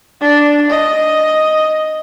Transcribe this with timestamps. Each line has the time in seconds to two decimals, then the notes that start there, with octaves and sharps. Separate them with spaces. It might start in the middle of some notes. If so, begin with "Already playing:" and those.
0.21 D4
0.69 D#5